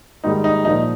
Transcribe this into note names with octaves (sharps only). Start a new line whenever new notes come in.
G#2 D#3 G3 D#4
D#4
A#2 F3 D#4